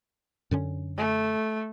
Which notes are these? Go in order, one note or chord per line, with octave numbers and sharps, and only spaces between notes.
F#2 D3 C#4
A3